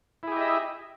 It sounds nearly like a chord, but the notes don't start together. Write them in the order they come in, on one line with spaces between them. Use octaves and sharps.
E4 G#4 G4 D#5 E5